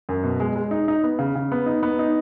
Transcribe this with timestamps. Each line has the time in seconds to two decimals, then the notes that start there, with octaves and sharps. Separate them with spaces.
0.09 F#2
0.23 B2
0.40 G#3
0.56 G#3
0.71 D#4
0.88 D#4
1.04 B3
1.19 C#3
1.35 C#3
1.52 B3
1.66 D#4
1.83 B3
1.99 D#4